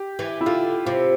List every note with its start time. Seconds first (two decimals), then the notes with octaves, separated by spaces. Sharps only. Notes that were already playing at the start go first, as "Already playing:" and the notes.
Already playing: G4
0.19 E3
0.41 E4
0.46 D3 F4
0.86 C3 F4